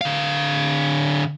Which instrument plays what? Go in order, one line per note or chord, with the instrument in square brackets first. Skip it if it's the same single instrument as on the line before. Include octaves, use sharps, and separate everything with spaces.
[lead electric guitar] D3 F5